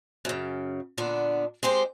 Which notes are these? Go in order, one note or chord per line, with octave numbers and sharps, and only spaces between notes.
F#2 C#3
A#2 D3 B3 D4
G#3 C4 G4 C5